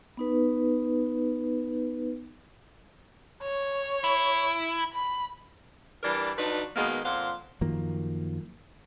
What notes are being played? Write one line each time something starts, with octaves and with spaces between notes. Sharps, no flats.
B3 D#4 B4
C#5
E4
B5
E3 G3 D4 A#4 D5
F3 F#3 D4 D#4 B4
B2 D#3 G#3 A#3 B3
F2 A#2 C5 F5 F#5
F#2 D#3 F3 A#3